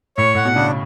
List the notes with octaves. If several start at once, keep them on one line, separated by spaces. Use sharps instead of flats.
A2 C#5
A2 F#5
B2
C#3 D4